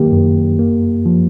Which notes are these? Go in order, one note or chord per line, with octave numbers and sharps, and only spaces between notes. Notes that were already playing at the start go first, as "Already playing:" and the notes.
Already playing: D#3 F#3 A#3 G4
F#2
A#3
F3